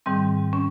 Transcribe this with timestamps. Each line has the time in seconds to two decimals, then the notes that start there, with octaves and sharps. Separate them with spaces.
0.06 G#2 D#3 G3 C4
0.53 C#4